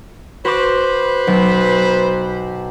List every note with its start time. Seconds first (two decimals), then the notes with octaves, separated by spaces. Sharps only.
0.45 F#4 B4 C5 C6 D6
1.27 B1